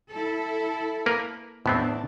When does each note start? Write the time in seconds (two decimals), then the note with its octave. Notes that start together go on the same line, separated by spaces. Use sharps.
0.10 E4 A4
1.06 A#3 A#4 B4
1.66 E2 A2 B3 C4 D4